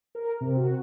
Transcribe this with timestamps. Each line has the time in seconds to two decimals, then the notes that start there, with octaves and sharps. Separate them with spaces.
0.15 A#4
0.41 C3
0.56 F#4